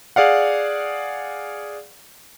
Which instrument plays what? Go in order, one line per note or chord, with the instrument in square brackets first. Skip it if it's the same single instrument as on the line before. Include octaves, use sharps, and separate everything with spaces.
[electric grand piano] G#4 D5 F5 F#5